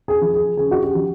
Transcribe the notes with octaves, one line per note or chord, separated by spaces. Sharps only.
G#4
F3
G#4
C#3 G#4
F#4
G4
F3